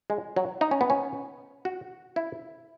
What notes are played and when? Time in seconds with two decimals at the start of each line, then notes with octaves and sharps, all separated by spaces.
0.10 G#3
0.36 F#3
0.61 D#4
0.71 C#4
0.81 B3
0.90 C#4
1.65 F#4
2.16 E4